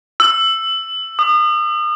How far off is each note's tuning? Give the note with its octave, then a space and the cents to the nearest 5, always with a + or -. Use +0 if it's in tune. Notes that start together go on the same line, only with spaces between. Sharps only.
E6 +10
D#6 -35